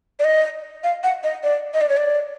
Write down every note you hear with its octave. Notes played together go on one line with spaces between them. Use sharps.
D5
D#5
F5
F#5
D#5
D5
D#5
D5
C#5
D5